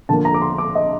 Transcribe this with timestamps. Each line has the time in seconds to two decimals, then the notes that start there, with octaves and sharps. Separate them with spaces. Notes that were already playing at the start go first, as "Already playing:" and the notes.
0.09 D3 F3 A#3 A5
0.25 A#5
0.34 D6
0.42 C6
0.58 D6
0.75 D#5